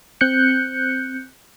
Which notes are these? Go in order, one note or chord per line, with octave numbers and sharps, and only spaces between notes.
C4 F#6 G6 C#7